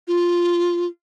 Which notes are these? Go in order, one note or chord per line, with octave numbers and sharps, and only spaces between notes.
F4